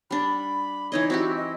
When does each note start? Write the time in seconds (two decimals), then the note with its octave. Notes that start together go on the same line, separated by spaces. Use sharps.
0.11 G3 D4 B5
0.92 E3 D#4 C#5 D#5
1.10 C4 E4 F#4 G4
1.36 D#5